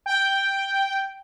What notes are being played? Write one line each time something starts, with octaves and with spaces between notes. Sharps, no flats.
G5